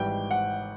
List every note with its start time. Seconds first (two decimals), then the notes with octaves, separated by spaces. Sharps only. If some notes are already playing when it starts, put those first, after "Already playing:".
Already playing: G#1 G#2 E3 G3 G5
0.31 F#5